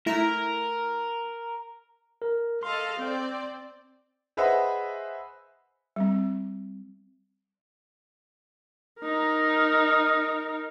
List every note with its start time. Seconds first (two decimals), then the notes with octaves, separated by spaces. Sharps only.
0.06 A3 E4 A#4 A#5
2.22 A#4
2.63 A4 D#5 F5 C6
2.99 C4 D5
4.37 G#4 B4 C5 D#5 E5 F#5
5.96 G3 C4
9.02 D#4 A#4